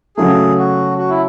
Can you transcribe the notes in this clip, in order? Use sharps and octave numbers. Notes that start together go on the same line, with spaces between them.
C#3 F#3 A3 G#4
F#4
F#4
E4